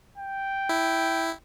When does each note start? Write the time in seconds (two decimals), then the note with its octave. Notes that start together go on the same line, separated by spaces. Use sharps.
0.18 G5
0.69 E4